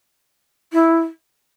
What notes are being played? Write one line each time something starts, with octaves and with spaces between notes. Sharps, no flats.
E4